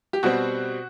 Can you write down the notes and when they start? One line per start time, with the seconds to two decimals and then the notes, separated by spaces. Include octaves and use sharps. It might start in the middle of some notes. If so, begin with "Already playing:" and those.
0.13 G4
0.23 B2 G3 C4 F#4